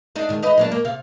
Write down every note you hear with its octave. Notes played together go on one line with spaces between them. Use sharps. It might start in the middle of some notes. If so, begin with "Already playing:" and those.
D4 D#4
G#2 D#3
D#4 B4 D#5
F#3 A#3 D4
A#3
C3 F5